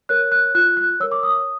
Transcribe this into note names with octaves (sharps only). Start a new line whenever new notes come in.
A#4 C#5 F#6
F#6
F4 F#6
F#6
A#4 C#5 E6
D6
D#6